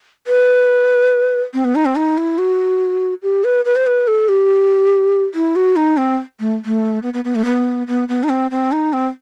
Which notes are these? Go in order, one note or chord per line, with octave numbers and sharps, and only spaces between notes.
B4
C4
B3
D#4
C4
D#4
E4
F#4
G4
B4
B4
C5
B4
A4
G4
E4
F#4
D#4
C4
A3
A3
B3
B3
B3
A3
B3
B3
B3
D#4
C4
C4
D#4
C4